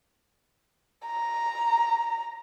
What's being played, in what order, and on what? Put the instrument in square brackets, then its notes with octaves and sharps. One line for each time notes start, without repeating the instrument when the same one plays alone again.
[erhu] A#5